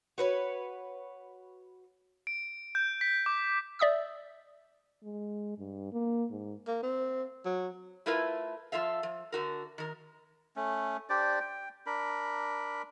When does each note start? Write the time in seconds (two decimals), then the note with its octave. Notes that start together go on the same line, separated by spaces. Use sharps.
0.18 F#4 B4 C#5
2.27 D7
2.75 G6
3.01 B6
3.26 D6
3.79 D5 E5 D#6 E6
5.04 G#3
5.59 G2
5.93 A#3
6.30 G#2
6.67 A#3
6.83 C4
7.45 F#3
8.06 A3 E4 F4 A#4 B4
8.72 F3 F4 A4 E5 F5
9.03 F3
9.32 D3 F#4 A#4
9.78 D#3 A#4
10.56 A3 C#4
11.10 D4 G4 C5 D5
11.40 G5
11.86 D4 A#4 B5